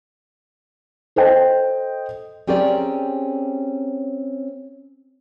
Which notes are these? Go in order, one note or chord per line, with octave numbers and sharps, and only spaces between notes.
A4 C5 D#5 G5
C4 C#4 G4 G#4 A#4 D5